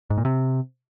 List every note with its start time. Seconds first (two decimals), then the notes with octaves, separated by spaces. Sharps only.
0.10 G#2
0.18 A#2
0.25 C3